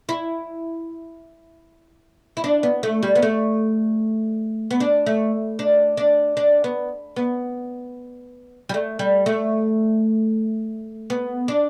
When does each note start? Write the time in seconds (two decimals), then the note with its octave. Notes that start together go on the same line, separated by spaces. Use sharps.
0.09 E4
2.37 E4
2.44 D4
2.63 B3
2.83 A3
3.03 G3
3.15 B3
3.22 A3
4.71 B3
4.80 D4
5.06 A3
5.59 D4
5.97 D4
6.37 D4
6.64 B3
7.16 B3
8.69 G3
8.74 A3
8.99 G3
9.26 A3
11.10 B3
11.48 D4